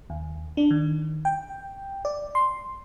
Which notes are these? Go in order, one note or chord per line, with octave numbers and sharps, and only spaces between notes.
D#2
D4
D#3
G5
D5
C6